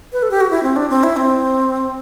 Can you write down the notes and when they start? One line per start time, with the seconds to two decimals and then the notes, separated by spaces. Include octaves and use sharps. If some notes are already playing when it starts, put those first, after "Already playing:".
0.13 B4
0.23 A4
0.31 G4
0.41 F#4
0.51 E4
0.63 C4
0.76 D4
0.90 C4
1.03 E4
1.16 C4